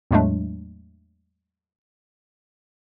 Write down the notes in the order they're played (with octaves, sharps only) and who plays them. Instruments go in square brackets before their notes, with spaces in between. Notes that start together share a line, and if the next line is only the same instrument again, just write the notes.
[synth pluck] E2 A2 F#3 G#3 A3 D4